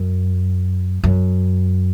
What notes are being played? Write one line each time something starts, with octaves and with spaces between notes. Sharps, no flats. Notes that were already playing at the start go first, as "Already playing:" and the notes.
Already playing: F#2
F#2